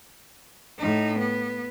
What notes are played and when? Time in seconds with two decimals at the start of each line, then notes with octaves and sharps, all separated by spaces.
0.78 A2 D#4
1.19 B3